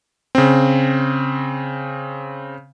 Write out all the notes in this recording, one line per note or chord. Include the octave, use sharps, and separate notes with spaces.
C#3 C4